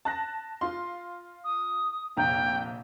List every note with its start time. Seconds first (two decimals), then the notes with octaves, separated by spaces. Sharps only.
0.05 A5 F#6 A#6
0.61 F4 F5 C6
1.44 D#6
2.17 F1 A#1 G5 A#5